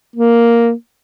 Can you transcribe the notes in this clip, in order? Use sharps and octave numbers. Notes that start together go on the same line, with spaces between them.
A#3